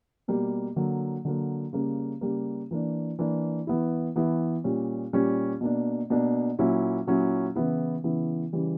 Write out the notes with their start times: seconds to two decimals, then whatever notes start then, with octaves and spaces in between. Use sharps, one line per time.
0.28 B2 G3 A#3
0.76 D3 F#3 A#3
1.25 D3 F#3 A#3
1.73 C#3 G3 A#3
2.21 C#3 G3 A#3
2.71 E3 A#3 D4
3.19 E3 A#3 D4
3.67 E3 B3 E4
4.16 E3 B3 E4
4.64 A#2 G3 C#4
5.13 A#2 G3 C#4
5.61 B2 A#3 D4
6.10 B2 A#3 D4
6.59 A#2 F#3 C#4 E4
7.07 A#2 F#3 C#4 E4
7.55 C#3 E3 B3 E4
8.04 C#3 E3 B3 E4
8.53 C#3 E3 G3